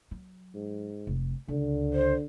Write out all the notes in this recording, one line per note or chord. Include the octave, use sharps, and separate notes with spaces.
F#3
G#2
F1
C#2 D3
C5